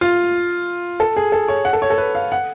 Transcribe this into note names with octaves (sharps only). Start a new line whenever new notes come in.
F4
A4
G#4
A4
C#5
F#5
A4
C#5
A4
B4
F5
F#5